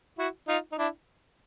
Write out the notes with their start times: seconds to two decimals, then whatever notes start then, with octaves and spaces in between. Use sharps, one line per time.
0.19 E4 F#4
0.48 D#4 F4
0.72 D#4
0.78 D4 E4